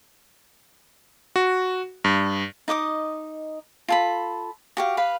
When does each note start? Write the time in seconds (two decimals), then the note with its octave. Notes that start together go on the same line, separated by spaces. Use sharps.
1.36 F#4
2.04 G2
2.68 D#4 D#5 D6 D#6
3.88 F4 A4 B5
4.77 F#4 G4 F5
4.97 B4 F5 B5